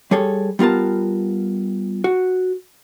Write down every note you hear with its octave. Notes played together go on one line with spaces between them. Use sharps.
G3 G#4 A4 C#5
G3 B3 F4 A#4 A5
F#4